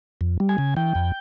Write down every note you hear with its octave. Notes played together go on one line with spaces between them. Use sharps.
F2
G3
G#5
C#3
E3 G5
F2